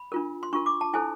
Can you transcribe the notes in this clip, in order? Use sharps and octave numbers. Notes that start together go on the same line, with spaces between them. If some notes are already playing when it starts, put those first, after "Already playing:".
Already playing: B5
D4 F4 A#4
C6
D4 F4 A#4 C#6
D6
A5
E4 A4 C5 G#5